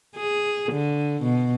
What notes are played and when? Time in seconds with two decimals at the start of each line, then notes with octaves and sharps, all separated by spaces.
0.16 G#4
0.72 D3
1.23 B2